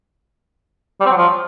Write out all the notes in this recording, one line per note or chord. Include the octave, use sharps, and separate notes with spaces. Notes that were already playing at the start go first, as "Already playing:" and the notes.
G3
C4
F#3
F3